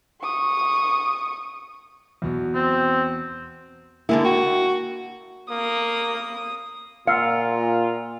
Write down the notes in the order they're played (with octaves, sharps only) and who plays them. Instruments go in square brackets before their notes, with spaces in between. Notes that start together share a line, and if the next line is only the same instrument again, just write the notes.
[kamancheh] C#6 D#6
[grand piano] E2 B2
[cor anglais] C4
[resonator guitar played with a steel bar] D3 G#3 E4 [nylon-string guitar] A#3
[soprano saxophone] F#4 [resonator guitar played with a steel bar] G5
[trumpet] A#3 [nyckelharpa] D#6
[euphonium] A#2 [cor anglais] F4 [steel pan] F5 [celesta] F#5 E6 C#7